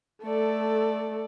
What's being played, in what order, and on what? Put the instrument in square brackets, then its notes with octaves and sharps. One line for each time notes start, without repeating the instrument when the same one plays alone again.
[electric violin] A3 [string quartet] A4 D5